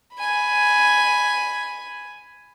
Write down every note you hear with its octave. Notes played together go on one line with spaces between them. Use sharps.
G#5 B5